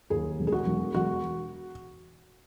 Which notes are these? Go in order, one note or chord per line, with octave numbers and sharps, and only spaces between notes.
D#2 G#4
E1
G#4
F#4
E1
E1 F#4